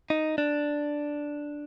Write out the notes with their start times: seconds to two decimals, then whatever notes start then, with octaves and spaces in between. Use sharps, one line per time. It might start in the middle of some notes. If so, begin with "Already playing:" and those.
0.10 D#4
0.38 D4